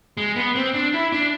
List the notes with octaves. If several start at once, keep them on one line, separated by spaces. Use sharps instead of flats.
G#3
B3
C4
D4
E4
D4